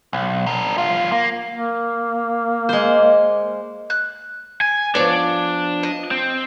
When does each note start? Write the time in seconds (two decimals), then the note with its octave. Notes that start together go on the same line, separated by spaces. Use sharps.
0.13 B1
0.46 D4 A#4
0.78 F#2 F4
1.12 A#3
1.50 A#3
2.69 G#3 C5
3.90 F#6
4.61 G#5
4.95 F3 B3 D4 C#5 D5
5.83 D#5
6.11 C4